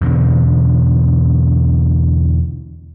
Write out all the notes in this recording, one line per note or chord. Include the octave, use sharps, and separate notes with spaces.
E2 B2 D3